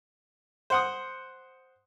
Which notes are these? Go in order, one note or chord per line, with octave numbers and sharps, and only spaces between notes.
C5 F#5 D#6